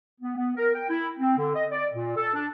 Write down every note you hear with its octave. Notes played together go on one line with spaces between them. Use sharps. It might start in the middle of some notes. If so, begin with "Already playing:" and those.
B3
B3
A#4
G5
E4
C4
D3
D#5
D5
A#2
A4
D4